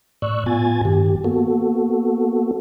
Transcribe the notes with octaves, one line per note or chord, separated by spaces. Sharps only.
A2 D5 C#6 E6 F#6
A2 B3 F4 G#5 G#6 A6
G2 D#3 G4
A#3 B3 F#4 A4